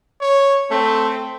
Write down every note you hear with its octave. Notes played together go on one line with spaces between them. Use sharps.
C#5
A3 C4